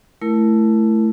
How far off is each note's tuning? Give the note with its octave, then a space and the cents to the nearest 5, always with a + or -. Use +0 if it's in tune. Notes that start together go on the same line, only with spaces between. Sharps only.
A3 -5 E4 +20 A#4 +0